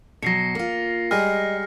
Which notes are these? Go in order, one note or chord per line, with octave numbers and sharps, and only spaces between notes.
B2 F#3 A#6 C7 C#7
A#3 F4
G3 G#3 D#5 F6